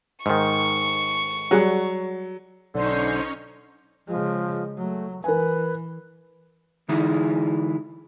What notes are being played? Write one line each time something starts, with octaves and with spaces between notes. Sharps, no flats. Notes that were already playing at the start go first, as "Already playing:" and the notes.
G#2 D#3 C#6
F#3 G3 G#4 F#5
B1 D3 C#4 D#4 C5 C#5
C#3 F3 G#3
F#3 A3
E3 A#4 B4 G#5
D3 E3 G#3 D#4 E4 G#4